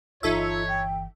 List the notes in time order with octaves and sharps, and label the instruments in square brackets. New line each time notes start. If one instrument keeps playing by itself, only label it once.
[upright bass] G1 E3 [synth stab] D#4 A4 E5 [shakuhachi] F4 [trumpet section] C#5
[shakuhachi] G5